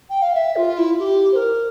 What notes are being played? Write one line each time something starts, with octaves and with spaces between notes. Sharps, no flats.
G5
F5
E5
F4
E4
G4
C5
A#4